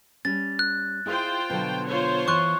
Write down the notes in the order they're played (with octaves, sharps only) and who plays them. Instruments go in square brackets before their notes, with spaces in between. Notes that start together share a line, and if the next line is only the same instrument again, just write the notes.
[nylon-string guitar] G3 C#4 [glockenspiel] A6
[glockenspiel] F#6
[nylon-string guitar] E4 G#4 D#5 [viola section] F4 C5 G5
[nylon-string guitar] B2 D3 F#3
[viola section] F4 C5 C#5
[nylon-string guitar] E3 [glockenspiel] C#6 F#6